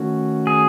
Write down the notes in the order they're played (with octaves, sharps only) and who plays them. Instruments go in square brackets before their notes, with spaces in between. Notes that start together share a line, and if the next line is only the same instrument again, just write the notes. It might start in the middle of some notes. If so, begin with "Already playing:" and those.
Already playing: [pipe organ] D#3 A3 C#4 F#4
[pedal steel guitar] G#4